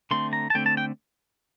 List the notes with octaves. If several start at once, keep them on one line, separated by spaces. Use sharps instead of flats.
D3 A3 C4 C6
A#5
A5
D3 A3 C4 G5
A5
G5